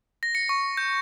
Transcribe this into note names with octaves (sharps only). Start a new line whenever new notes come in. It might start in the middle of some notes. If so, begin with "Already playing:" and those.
A#6
C#7
C#6
G6